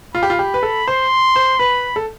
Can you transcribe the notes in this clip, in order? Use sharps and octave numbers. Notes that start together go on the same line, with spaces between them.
F4 B5
G4
F4
G4
B4
A4
C5 C6
C5
B4 B5
A4